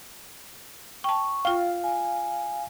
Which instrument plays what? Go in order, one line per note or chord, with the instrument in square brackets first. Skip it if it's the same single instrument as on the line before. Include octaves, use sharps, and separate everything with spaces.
[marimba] G5 A5 [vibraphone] C#6
[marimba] F4 G5 [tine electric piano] F5
[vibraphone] G#5